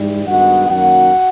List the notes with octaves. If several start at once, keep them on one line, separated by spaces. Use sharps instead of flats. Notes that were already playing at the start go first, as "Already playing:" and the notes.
Already playing: G#2 E3 G3
G2 D#3 G#3 B3 F#4 F#5
F#2 D#3 F#3 A#3 F#4 F#5